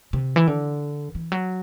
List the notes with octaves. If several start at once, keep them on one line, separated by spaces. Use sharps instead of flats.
C3
E3
D3
E3
F#3